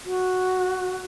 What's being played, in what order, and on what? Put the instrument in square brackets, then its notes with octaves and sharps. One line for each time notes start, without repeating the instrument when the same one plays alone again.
[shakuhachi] F#4